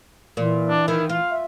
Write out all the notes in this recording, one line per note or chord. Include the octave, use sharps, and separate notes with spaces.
A#2 E3
D4
D#3 E4
F4 F5
E5